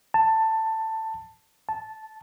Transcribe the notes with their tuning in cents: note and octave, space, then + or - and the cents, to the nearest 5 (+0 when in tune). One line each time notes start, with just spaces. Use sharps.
A5 +15
A5 -5